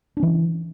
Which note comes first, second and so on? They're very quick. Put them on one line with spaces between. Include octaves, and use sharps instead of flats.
D4 C#4 E3